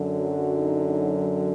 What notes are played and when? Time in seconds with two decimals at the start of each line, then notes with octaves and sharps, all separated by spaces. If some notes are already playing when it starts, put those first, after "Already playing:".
Already playing: F#2 D3 F#3
0.27 F#4
0.57 D#4
0.86 D#4